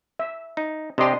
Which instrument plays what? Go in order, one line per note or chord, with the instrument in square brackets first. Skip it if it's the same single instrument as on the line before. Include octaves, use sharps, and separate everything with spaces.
[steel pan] E5
[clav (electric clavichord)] D#4
[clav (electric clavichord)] C3 G4 [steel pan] D4 D#5 C6